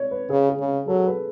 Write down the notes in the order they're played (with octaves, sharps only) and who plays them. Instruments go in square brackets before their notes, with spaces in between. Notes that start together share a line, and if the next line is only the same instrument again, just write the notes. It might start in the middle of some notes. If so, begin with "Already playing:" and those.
Already playing: [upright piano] C#5 D5
B4
[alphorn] C#3 [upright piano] G#4
[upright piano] G#4
[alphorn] C#3
[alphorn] F#3 [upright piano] A4
[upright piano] B4